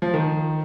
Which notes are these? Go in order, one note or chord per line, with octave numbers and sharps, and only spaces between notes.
F3
D#3